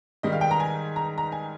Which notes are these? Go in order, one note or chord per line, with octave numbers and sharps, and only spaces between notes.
G#2 D#3 G3 D#5
F5
G5
A#5
G#5
A#5
A#5
G#5